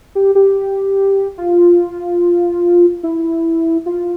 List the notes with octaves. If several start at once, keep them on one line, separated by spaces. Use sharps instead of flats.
G4
G4
F4
E4
F4